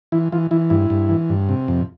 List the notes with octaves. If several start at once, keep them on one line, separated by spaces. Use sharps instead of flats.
E3 E4
E3 F4
E3 E4
G2 E4
G2
E3
G2
C3
F2